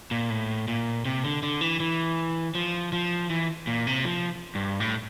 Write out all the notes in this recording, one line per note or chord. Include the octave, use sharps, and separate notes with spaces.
A#2
A2
A#2
C3
D3
D3
E3
E3
F3
F3
E3
A#2
C3
F3
G2
A2